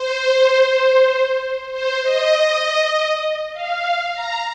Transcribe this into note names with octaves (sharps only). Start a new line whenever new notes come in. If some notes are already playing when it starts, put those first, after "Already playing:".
Already playing: C5
C5
D#5
F5
A#5